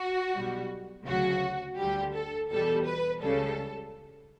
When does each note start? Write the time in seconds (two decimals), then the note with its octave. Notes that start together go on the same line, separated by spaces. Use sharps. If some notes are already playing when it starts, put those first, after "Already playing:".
Already playing: F#4
0.35 B1 B2 G3
1.07 D2 C#3 F#3 F#4
1.78 D2 D3 G3 G4
2.14 A4
2.50 E2 B2 G3 A4
2.87 B4
3.22 C#2 C#3 G3 A4